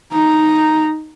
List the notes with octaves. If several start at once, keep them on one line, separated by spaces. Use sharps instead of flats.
D#4 A#5